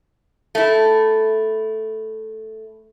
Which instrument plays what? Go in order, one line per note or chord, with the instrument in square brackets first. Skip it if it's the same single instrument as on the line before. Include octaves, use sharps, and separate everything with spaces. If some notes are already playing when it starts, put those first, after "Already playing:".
[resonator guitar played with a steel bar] A3 E4